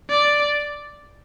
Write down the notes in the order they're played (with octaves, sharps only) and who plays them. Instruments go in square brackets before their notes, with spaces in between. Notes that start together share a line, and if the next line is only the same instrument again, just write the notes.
[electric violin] D5